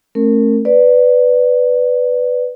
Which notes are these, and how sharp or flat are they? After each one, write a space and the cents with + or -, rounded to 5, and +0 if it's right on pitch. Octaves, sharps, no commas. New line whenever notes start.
A3 +0 C#4 -35 A#4 -20
B4 +10 D5 +0